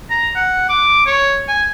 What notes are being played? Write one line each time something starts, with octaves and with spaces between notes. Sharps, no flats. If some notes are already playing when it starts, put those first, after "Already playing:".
A#5
F#5
D6
C#5
G#5